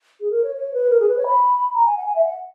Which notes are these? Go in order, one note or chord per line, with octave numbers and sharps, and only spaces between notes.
G#4
A#4
C#5
C#5
B4
A#4
G#4
B4
C#5
B5
A#5
G#5
F#5
G#5
E5
F#5